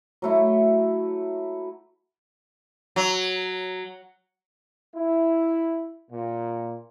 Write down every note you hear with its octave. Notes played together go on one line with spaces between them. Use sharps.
F#3 A3 E4
F#3
E4
A#2